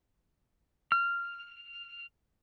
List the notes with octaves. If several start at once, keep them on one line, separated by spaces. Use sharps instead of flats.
F6